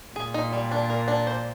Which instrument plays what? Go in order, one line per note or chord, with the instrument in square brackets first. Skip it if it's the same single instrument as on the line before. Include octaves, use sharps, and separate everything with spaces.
[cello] A#2 [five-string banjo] G#4
[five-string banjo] D#4
G3
D4
A#4
D4
C5